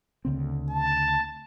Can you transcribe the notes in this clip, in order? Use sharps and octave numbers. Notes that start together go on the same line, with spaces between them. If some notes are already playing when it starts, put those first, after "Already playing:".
D2 C#3 C4
A5